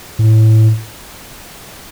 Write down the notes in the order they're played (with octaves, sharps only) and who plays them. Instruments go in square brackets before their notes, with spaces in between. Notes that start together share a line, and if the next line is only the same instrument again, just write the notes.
[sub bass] A2